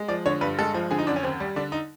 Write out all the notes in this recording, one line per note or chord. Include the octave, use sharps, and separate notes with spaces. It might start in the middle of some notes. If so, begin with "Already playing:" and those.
Already playing: G#3
F3 D5
D3 C#5
G2 B4
G#3 A4
F3
D3 G#4
D#4
F#2 D4
C#4
D#2 C4
G3
D3 D4
D#4